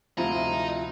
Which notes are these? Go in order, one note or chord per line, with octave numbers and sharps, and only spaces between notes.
D2 C3 F3 E4 F4 D#5 A#5